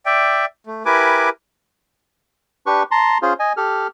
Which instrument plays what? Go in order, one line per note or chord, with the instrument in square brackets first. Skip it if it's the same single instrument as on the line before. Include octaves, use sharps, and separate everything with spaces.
[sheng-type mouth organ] D5 E5 G5
A3
E4 G4 A#4 B4 G#5 D6
[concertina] D4 G4 B4 C#6
A5 A#5 C6
C#4 F4 G#4 C5
D#5 G#5
G4 A4 F6